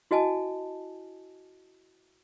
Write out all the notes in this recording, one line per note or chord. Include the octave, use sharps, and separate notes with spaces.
E4 F#4 D#5 G#5 A5